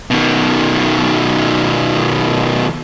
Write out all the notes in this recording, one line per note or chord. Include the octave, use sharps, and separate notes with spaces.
B2 D#3